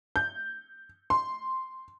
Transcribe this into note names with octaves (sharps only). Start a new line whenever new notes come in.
G6
C6